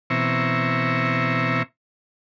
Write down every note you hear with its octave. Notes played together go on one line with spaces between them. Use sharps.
B2 E3 C4 E5 A#5 C#6